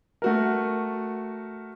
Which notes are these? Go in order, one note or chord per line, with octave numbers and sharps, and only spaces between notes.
A3 F#4 A#4